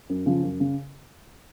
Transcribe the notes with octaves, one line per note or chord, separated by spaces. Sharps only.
F#2
C#3 F3
F#2
C#3